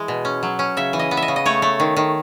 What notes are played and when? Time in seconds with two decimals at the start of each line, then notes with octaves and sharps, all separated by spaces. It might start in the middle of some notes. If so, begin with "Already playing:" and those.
Already playing: E3 G#3
0.08 B2
0.25 C#4
0.43 F#3
0.59 C#4
0.77 C#3 E5
0.93 E3
0.99 D#5
1.11 B3
1.17 E5
1.22 D#5
1.28 C#3
1.36 D#5
1.46 A3 C#5
1.62 A3
1.80 D#3
1.97 D#3